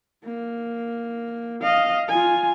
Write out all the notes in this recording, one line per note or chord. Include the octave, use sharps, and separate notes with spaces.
A#3
D#5 F5
F4 G#5